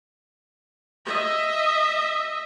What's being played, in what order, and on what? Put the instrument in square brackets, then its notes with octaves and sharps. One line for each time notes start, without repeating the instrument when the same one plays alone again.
[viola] D#5 E5